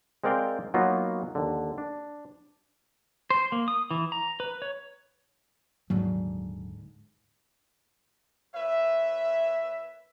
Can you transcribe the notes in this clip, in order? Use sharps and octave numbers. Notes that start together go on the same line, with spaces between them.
G#3 C4 A#4 D5 F5 G5
F#3 A#3 B3 D#4 F4 F#4
D#2 D3
D4
C5
A#3
D#6
E3
A#5
B4
C#5
D#1 G#2 D3 F#3
A#2 B4 C#5 E5